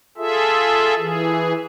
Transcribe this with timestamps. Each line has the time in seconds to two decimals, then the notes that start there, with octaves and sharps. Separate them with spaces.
0.18 F4 G#4 A4 E5
0.99 E3 G#4